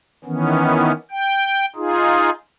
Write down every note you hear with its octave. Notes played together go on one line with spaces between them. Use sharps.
D#3 E3 B3 C#4
G5
D#4 F4 G#4